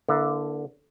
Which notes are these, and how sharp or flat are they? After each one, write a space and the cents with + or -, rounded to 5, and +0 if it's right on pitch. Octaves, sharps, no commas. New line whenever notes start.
D3 +0 A#3 +35 E4 +0